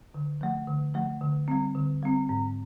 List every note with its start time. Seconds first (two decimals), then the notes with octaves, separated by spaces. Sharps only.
0.14 D3
0.41 F3 A3
0.67 D3
0.94 F3 A3
1.21 D3
1.48 G3 C4
1.75 D3
2.03 G3 C4
2.29 G#2